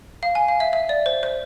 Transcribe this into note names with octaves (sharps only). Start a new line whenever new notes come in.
F5
G#5
F5
E5
E5
D5
C5
C5